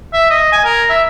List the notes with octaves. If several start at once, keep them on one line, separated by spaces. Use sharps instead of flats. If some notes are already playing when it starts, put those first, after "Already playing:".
E5
D#5
G#5
A#4
E5